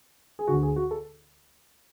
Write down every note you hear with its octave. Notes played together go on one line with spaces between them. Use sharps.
G#4
D2 D3 F#4
G#4
F#4
A4